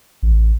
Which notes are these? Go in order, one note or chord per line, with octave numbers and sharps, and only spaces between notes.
A1